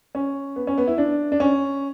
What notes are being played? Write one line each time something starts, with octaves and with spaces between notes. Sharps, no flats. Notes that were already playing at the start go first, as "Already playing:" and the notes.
C#4
B3
C#4
B3
E4
D4
D4
C#4